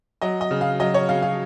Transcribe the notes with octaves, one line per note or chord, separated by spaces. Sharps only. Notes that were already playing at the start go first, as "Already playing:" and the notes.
F#3 D#5
D#5
C#3
F5
F#3 D#5
C#5
C#3 F5
F5